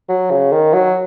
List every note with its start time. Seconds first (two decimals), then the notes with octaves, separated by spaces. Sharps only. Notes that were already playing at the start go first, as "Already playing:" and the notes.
0.09 F#3
0.31 C#3
0.52 D#3
0.73 F#3